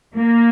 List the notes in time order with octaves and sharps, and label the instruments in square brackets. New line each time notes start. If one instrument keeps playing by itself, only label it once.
[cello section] A#3